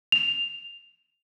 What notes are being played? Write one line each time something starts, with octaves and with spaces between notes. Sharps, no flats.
F7